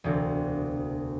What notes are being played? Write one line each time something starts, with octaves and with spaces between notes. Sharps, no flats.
E1 D2 C3